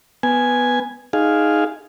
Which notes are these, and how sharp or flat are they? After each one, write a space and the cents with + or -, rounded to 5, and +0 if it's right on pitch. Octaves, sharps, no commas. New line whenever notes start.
B3 +0 G#5 +0
D#4 +0 G#4 +0 F5 +0